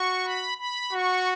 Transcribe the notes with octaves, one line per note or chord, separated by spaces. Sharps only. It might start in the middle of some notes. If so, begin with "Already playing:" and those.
Already playing: F#4 C#6
B5
B5
F#4 C#6